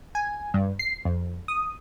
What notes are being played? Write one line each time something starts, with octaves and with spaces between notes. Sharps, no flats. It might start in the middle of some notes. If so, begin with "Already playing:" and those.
G#5
G2
C7
F2
D#6